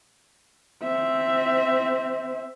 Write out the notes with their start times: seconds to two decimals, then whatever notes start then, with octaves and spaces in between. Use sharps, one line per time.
0.83 C4 E5